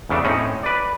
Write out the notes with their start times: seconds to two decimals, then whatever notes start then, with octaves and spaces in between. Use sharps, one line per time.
0.09 E2 C#3 A3 D4
0.24 A2 C4 C#4 D#4
0.63 B4 D5